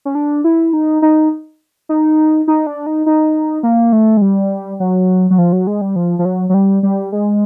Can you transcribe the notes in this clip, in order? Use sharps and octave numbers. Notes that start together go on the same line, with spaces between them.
C#4
D4
E4
D#4
D#4
D#4
D#4
D4
D#4
D#4
A#3
A3
G#3
G3
F#3
F#3
F3
F#3
G#3
G3
F3
F3
F#3
F#3
G3
G3
G#3